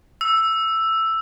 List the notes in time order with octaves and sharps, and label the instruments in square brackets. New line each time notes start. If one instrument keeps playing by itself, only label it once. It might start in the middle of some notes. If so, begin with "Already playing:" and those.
[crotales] E6